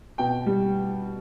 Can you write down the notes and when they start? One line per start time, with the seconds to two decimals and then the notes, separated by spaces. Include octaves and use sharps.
0.18 B2 G5
0.46 G3